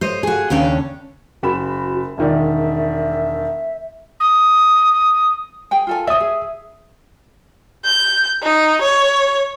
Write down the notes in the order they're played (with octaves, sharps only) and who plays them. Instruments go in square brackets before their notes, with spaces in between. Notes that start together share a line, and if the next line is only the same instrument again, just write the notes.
[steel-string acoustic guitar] C5 C#5 D#5
F#4 G#4
D#2 C#3 C#4 D4 C#5 G5
[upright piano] F#1 B5 E7 [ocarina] F#4
[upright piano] E1 D#3 D5 [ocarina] E5
[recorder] D#6
[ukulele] G#4 G5 G#5
F4 A4 G#5
[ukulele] C#5 D5 [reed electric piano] E5 D#6
[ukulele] G#4
[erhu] G6
D#4
C#5